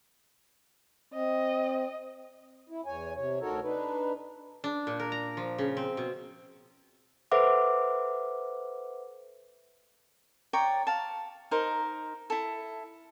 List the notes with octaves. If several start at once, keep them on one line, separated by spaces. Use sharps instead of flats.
C4 D#5
E4
E2 C#5 G#5
C3 C#5
D2 D#4 F#4 A4 A#4 C#5
D4 D#4 B4
D4
A#2
A#4
A#5
F3
C#3
C4
B2
A4 B4 C5 E5 F#5 D6
C#5 D5 G5 A#5
F5 A5
D#4 A#4 C5
E4 A4